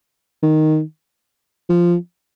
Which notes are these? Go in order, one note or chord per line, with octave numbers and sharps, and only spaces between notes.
D#3
F3